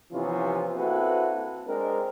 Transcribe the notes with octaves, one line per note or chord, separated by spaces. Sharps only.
C3 E3 F3 B3 C#4 F4
A#3 C4 E4 F#4 A4 B4
G#3 C4 D4 G#4 A#4